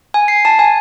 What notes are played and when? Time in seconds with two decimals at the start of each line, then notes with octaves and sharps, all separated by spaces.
0.14 G#5
0.28 C7
0.45 A5
0.59 G#5